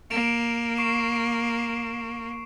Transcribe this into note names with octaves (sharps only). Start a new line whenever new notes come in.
A#3 D7 E7 F7
C#6 C7 E7